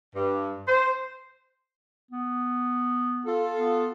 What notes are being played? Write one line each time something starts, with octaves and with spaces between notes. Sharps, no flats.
G2
C5
B3
F4 A4
B3